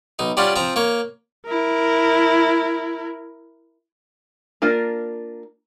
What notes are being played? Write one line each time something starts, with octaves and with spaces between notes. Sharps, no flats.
B1 D#4
G3 C#4 D4 F4 F#5
F3 C4 A#5
A#3 C#5
E4 A#4
A#3 D4 F4 A#4